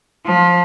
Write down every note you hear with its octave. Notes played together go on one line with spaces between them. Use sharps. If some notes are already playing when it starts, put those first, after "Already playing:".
F3